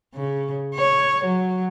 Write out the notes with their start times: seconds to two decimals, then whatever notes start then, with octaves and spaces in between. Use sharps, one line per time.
0.15 C#3
0.74 C#5
1.25 F#3